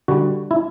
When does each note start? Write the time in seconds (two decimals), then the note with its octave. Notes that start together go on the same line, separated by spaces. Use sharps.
0.08 D3 G3 F#4
0.51 E4